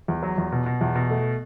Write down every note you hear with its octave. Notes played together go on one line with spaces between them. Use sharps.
E2
F#3
E2
B2
B2
E2
B2
A3